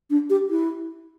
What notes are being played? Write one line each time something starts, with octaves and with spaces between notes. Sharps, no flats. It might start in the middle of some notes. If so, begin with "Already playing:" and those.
D4
G4
E4